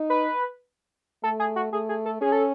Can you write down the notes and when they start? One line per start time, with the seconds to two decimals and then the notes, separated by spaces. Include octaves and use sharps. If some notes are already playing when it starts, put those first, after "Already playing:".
Already playing: D#4
0.10 B4
1.23 A3 A4
1.40 G#4
1.56 F#4
1.72 A3 G#4
1.89 G#4
2.05 A4
2.21 C#4 G#4
2.32 A4